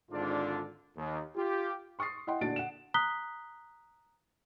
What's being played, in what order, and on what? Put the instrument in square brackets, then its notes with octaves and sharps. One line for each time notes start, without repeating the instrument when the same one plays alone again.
[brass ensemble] G#1 G#2 D3 D4 F4 D5
D#2
F4 G4
[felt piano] C6 C#6 D#6 A6 C7
E4 D#5 F#5 G5 C6
A#2 D3 D4 F#4 A6 D7
F#5 E7
[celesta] A#5 D#6 F#6 B6 G7